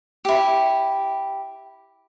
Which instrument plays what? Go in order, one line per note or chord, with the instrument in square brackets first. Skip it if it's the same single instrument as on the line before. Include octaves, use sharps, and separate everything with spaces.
[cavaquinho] E4 G4